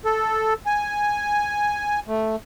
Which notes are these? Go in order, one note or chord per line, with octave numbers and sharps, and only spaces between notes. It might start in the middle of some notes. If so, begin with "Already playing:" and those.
A4
G#5
A3